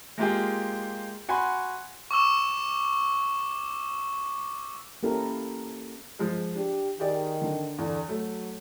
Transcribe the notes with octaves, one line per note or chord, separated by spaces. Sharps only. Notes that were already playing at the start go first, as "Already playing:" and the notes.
G#3 A#3 F4 G4 G#4
F#4 F#5 G#5 B5 C6
C#6 D6 E6 E7
A#3 C#4 E4 G4 A4 A#4
F3 G#3
D4 G4
D#3 G4 G#4 D5
D3
E2 D3
F#3 A3